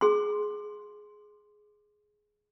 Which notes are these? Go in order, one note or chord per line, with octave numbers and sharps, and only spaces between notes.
G#4 C6